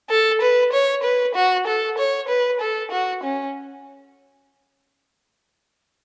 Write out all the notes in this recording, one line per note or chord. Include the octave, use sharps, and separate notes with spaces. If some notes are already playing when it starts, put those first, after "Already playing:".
A4
B4
C#5
B4
F#4
A4
C#5
B4
A4
F#4
C#4